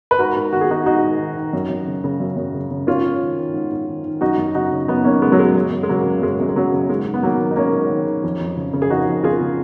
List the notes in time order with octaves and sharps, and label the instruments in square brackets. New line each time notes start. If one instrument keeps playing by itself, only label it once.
[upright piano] B4
G#2 F#4 A#4
G#2
D#3 F#4
G#4
D#3 D#4 F#4
G#2 D#4 F#4
G#2
D#3
D#3
F#2
F#2
C#3
C#3
F#2
F#2
C#3
C#3
G#2 C#4 F4
G#2
D#3
D#3
G#2
G#2
D#3
D#3
F#2 D#4 F#4
F#2
C#3 D#4 F#4
C#3
F#2 B3 D#4
F#2 A#3 C#4
C#3 G#3 B3
F#3
C#3 G#3
F#2 G#3
F#2
G#3
C#3 F#3 A#3
C#3
F#2 G#3
F#2
G#3
C#3 F#3
C#3
G#2 G#3
G#2
B3
D#3 F#3 A#3
D#3
D#4
G#2 A#3 C#4
G#2
D#3
D#3
F2
F2
C#3
C#3
G#4
F2 D#4 F#4
F2
C#3 F4 G#4
C#3